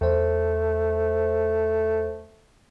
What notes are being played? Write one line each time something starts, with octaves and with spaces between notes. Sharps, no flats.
E2 A3 C5